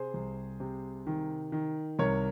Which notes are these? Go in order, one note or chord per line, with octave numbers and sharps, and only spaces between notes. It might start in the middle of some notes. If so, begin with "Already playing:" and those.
Already playing: C3 G#4 C5
C2
C3
D#3
D#3
C2 A#4 C#5